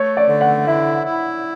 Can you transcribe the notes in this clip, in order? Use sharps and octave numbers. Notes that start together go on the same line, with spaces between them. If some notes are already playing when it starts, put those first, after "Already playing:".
Already playing: A3 C#5
D5
D3
F#5
E4 E5
E4